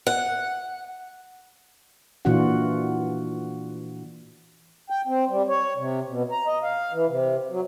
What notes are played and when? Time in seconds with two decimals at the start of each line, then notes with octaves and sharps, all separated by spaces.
0.07 F#5
2.25 A#2 E3 D4 F4 F#4 F#5
4.90 G5
5.07 C4
5.29 G3
5.49 C#5
5.77 C3
6.09 B2
6.32 A#5
6.46 D#5
6.63 F5
6.92 E3
7.09 C3
7.50 F#3